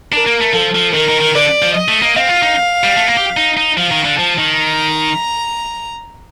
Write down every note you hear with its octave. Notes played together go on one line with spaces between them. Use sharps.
D4 A#4
A#3
A3
F3 A4
F3
D#3 A#4
D#3
D#3
D3 D5
F3
D#5
A3
A#3
C4 F5
F4
D#4
G3
A3
A#3
G4
D#4
D#4
F3 F5
D#3
D3
F3 A5
D#3
A#5